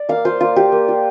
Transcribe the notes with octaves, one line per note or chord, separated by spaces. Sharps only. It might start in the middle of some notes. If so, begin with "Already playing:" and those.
Already playing: D5
A#3 F5
F4 C5
A#3 F4
F4 G4
A#3
F4